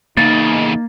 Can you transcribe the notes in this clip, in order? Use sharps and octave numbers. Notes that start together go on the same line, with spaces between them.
E2 C#3 A#3 D#4 A6